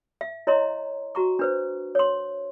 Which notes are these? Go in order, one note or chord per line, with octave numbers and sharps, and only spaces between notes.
E5
E4 C#5 D#5 A#5 C6
F#4 A#5 C#6
D4 B4 C5
C#5 C6